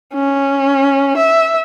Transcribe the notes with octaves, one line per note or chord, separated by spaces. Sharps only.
C#4
E5